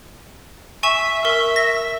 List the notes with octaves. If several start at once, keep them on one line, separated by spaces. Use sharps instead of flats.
E5 G#5 C#6 E7
A#4 E5 C#6
A#6